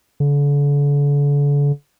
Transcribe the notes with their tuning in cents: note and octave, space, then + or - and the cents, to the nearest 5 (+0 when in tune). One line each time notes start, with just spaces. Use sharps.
D3 -40